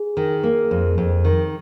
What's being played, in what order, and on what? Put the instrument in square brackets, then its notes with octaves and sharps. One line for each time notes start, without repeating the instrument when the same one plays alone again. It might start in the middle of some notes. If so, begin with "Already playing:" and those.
Already playing: [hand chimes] G#4
[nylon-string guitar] D#3
A#3
F2
F2
D#3